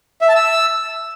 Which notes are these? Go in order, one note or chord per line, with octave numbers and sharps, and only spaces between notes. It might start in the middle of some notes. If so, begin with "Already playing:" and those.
E5
A5
E6